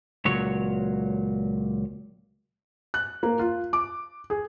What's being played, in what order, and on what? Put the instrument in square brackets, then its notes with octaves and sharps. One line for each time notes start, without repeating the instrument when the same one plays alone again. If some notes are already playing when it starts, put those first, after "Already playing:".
[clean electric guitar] C#2 A#2 F#3 C#5
[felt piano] F#6
A#3
F4
D6
G#4